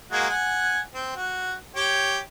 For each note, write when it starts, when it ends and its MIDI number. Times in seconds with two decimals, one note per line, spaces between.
0.11 0.28 56
0.11 0.28 58
0.11 0.28 66
0.30 0.80 78
0.30 0.80 80
0.94 1.12 60
1.16 1.53 66
1.75 2.19 67
1.75 2.19 73
1.75 2.19 79